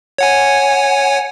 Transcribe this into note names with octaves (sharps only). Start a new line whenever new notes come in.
C#5 F#5 G#5